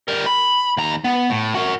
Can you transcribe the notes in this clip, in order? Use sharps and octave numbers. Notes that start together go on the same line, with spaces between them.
G3 A#4
B5
D#2 A#5
B3
A2
F#4 A#4